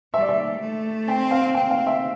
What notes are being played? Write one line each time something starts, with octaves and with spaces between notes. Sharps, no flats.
G3 E5
D5
E5
A3
C4 G5
F5
C4 G5
F5
E5